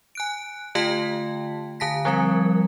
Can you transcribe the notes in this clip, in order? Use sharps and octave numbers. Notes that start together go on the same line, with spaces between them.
G#5 F#6 D7
D3 A3 F4 G5 A5 B6
D3 G#5 A5 A#6 B6
F3 G3 C4 A#4